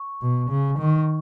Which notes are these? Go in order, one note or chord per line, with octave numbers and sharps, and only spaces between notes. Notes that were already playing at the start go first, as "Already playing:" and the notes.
Already playing: C#6
B2
C#3
D#3